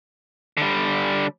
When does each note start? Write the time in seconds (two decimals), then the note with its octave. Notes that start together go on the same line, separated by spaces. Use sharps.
0.57 D3 G3